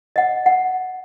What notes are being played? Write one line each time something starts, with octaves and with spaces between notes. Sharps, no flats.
D#5 F#5
F#5